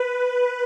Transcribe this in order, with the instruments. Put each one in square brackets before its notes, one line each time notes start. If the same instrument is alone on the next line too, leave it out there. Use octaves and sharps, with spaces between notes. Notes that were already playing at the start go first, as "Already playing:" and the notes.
Already playing: [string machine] B4